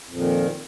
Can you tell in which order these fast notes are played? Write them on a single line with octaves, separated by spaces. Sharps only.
F2 A#2 D#3